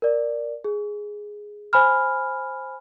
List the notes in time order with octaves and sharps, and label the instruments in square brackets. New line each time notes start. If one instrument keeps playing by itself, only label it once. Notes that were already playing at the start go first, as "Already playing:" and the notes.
[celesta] A#4 D5
G#4
C5 G#5 B5 F6